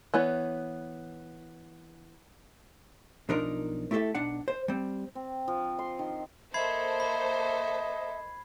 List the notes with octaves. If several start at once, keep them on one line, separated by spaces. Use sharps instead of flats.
E3 B3 C#5
B1 F3 D4 D#4 A#4
A3 E4 G4 A4 E5
B1 D4 F#5
C5
G3 C4
C4
F3
C6
D#3
A#3 A4 C5 D#5 E5 B5 G#6 C7
B5